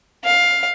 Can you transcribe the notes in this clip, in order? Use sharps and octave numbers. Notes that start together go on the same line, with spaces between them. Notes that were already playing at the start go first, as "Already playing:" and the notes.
F5